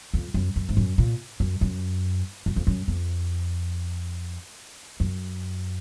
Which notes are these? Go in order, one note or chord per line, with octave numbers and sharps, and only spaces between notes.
F2
F#2
F#2
G#2
F#2
A#2
F#2
F#2
F#2
F2
F#2
F2
F#2